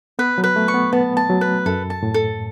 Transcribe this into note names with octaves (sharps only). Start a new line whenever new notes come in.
B3 B4
F#3
B4
A3
C#6
B3
B3 A5
A5
F#3
B4
F#2 A4
A5
A2
A4